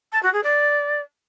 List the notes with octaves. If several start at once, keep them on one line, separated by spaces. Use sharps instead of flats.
A5
F#4
G#4
D5